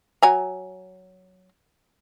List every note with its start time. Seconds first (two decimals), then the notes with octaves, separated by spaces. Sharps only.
0.23 F#3 G#5 A#5